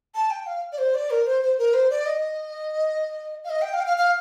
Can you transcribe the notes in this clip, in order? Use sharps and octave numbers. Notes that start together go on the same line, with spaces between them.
A5
G5
F5
D5
C5
D5
A#4
C5
C5
A#4
C5
D5
D#5
F5
D#5
G5
F5
G5
F5
F5